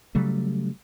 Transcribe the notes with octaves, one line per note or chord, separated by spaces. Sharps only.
C#3 F#3 G3 A3